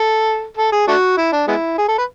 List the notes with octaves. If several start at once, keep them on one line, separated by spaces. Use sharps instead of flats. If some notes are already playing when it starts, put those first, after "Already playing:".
Already playing: A4
A4
G#4
A3 D4 F#4
E4
D4
G#3 B3 E4
G#4
A4
B4